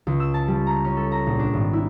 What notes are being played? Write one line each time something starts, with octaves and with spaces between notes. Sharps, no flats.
C#2
E6
A5
G3
A#5
C#4
A4
A#5
A#1
D4
G#1
E4